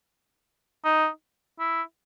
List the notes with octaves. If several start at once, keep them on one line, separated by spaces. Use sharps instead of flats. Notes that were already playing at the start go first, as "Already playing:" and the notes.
D#4
E4